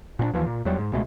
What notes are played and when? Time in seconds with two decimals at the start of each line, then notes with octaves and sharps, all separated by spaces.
0.19 A#2 B3 D4
0.34 D#2 E3 F3
0.47 A#2
0.65 E2 F#3 G3
0.79 G#2
0.92 C#2 B2 G#3 A3